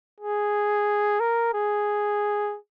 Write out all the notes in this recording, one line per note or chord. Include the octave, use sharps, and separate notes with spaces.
G#4
A#4
G#4